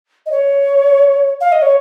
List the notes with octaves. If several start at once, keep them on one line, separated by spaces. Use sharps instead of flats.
D#5
C#5
F5
D#5
C#5